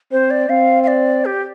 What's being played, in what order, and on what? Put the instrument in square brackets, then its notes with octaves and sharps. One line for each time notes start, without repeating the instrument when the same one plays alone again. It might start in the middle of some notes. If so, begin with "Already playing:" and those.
[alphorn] C4 [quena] C5
[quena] D5
[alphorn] C4 [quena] F5
[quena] F5
D5
G4